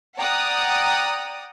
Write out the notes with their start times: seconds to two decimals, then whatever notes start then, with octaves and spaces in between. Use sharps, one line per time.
0.17 D5 F#5 G5 A#5 D#6